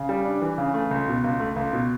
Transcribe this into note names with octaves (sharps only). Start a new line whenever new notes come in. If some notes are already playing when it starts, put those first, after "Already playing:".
Already playing: C#3
G3
D4
E3
C#3
A3
C#2
B2
C#2
A3
C#2
B2